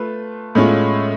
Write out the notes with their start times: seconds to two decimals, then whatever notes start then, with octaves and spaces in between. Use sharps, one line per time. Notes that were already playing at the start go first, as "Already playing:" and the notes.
Already playing: A3 F4 B4
0.55 A2 G#3 C#4 F4